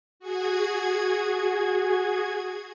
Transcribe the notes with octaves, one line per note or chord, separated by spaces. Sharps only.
F#4 G#4 G#6